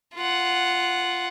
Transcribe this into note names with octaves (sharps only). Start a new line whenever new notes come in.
F4 F#5